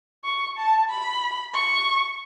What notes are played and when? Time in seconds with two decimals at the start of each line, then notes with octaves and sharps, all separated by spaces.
0.24 C#6
0.57 A5
0.89 B5
1.54 C#6